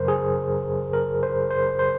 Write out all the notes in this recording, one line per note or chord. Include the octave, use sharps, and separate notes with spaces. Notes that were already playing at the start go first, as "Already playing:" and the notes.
Already playing: F#2 C#3 F#3 A#4 C5
G#4
A#4
C5
C5
C5